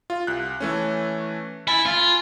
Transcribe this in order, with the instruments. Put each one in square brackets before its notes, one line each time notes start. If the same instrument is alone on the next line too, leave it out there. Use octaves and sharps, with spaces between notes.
[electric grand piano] F4
C2 F#6
E3 A3 C#4
[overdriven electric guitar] E4 [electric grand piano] G#5 B5 A6
[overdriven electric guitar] F4